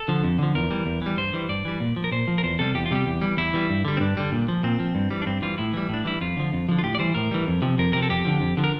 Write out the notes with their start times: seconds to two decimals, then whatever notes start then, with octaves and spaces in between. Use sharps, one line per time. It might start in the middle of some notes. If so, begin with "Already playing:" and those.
Already playing: A4
0.08 D3 F3
0.24 F2
0.39 D3 F3
0.55 E2 A#4
0.70 E3 G3
0.86 E2
1.02 E3 G3
1.17 G2 C5
1.33 E3 G3
1.49 G2 D5
1.65 E3 G3
1.80 A#2
1.96 F3
2.04 A#4
2.12 A#2 C5
2.28 F3
2.38 A#4
2.43 E2 C5
2.59 C3 G3 A4
2.75 E2 G4
2.86 F4
2.91 C3 G3 G4
3.06 E2
3.21 E3 G3
3.37 E2 E4
3.54 E3 G3
3.70 G2
3.85 D3 G3
3.97 C4
4.00 G2 D4
4.17 D3 G3
4.32 A#2
4.48 F3
4.63 A#2 C4
4.80 F3
4.95 G2
5.11 E3 G3
5.22 D4
5.26 G2 C4
5.42 E3 G3 F4
5.58 A2 E4
5.73 E3 G3
5.89 A2 D4
6.05 E3 G3 E4
6.21 F2 F4
6.37 D3 F3
6.52 F2
6.69 D3 F3
6.79 F4
6.83 A2 G4
6.95 D5
6.99 E3 G3 C5
7.15 A2 A#4
7.31 E3 G3
7.47 F2
7.62 C3 F3
7.78 F2 A#4
7.93 C3 F3 A#4
8.03 A4
8.09 F2 G4
8.25 D3 F3
8.41 F2
8.57 D3 F3
8.64 A#4